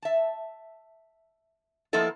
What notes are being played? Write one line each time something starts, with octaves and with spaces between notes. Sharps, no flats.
E5 A5
F3 A#3 B3 E4 A4 D#5